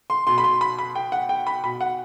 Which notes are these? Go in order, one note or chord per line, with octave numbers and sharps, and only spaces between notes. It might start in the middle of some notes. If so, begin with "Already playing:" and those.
C6
B2 C6
B5
C6
B5
B5
G5
F#5
G5
B5
B2 B5
F#5